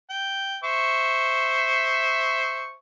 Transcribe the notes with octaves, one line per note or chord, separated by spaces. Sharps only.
G5
C5 E5 C#6